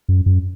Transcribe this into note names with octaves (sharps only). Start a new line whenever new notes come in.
F#2
F#2